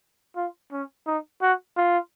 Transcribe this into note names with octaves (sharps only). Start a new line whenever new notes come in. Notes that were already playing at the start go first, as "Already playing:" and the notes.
F4
C#4
D#4
F#4
F4